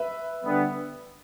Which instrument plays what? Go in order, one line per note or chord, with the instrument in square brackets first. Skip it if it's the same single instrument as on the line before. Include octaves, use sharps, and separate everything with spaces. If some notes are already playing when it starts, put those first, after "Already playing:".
Already playing: [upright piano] B4 E5
[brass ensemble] D3 G3 B3